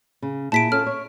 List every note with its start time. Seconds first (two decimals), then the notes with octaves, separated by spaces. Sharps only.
0.22 C#3
0.52 A#2 E4 G#4 A5 B6 D7
0.72 C#4 F4 A4 F6
0.86 C#5